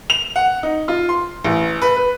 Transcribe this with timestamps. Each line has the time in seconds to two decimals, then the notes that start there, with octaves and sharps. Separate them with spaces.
0.10 F7
0.36 F#5
0.63 D#4
0.88 F4
1.09 C6
1.44 A1
1.82 B4
1.96 B4